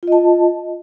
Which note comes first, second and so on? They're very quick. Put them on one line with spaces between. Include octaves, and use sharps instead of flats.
F4 D#5 A5